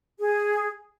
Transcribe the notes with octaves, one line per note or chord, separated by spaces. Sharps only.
G#4